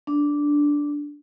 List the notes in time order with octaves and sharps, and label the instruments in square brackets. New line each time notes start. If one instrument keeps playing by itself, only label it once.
[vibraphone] D4